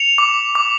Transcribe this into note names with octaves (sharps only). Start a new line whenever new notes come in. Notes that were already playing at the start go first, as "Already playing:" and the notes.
Already playing: C#7 F7
D6
D6